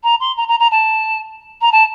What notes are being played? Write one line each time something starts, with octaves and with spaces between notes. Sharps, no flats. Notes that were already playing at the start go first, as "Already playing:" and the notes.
A#5
C6
A#5
A#5
A#5
A5
A#5
A5